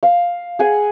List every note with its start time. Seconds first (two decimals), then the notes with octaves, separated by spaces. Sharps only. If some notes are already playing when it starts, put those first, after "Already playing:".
0.03 F5
0.59 G#4 F#5 G#5